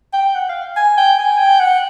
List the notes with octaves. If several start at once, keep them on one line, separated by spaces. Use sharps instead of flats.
G5
F#5
F5
G#5
G5
G#5
G5
F#5